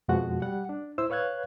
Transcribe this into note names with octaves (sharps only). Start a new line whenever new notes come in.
F2 B2 F3 G#3 F#4 F#5
G3 F#5
D4
E4 C5 E6
B4 C#5 F5 F#6 G#6